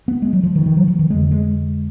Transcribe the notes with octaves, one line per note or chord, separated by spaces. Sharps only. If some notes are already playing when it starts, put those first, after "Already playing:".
B3
G#3
F#3
F3
D#3
D#3
F#3
F3
D#3
F2 D3 G#3
G#3